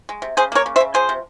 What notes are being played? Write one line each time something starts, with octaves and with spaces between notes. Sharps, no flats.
G#3
C3
C#3 G#4 C5
A#3 A#4 C#5
C#3
C5 E5
C#3
F3 G#4 C5
C3